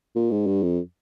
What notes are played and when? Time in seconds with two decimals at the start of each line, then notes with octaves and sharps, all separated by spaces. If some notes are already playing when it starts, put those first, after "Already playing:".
0.16 A#2
0.31 G#2
0.47 G2
0.63 F2